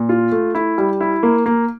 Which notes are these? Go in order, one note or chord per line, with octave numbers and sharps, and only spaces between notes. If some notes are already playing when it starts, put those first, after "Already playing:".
Already playing: A#2
F4
A3
E4
G3
E4
A#3
A#3